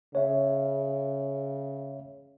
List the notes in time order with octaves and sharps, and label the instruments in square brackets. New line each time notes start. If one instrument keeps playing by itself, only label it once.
[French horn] C#3 [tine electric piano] C#5 E5